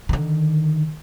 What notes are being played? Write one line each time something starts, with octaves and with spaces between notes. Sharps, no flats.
D3 D#3